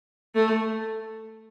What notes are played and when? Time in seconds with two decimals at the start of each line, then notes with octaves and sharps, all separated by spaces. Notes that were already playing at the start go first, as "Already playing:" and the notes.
0.35 A3